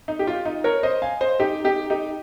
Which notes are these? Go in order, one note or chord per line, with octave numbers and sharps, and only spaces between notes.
D#4
G4
F4
D#4
A#4 C#5
C5 D#5
F5 G#5
C5 D#5
D#4 G4
D#4 G4
D#4 G4